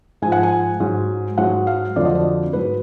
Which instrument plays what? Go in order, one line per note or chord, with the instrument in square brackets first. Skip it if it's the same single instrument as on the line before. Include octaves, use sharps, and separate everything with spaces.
[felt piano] G#2 F3 G#5
F#5
G#5
G#2 F#3
G#2 F#3 F#5
F5
F2 D3 F#3 D5
D#5
D5
G#2 F#3 B4